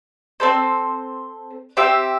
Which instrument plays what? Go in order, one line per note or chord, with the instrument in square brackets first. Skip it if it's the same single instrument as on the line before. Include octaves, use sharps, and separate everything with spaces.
[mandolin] C4 A4 C5
C4 G4 E5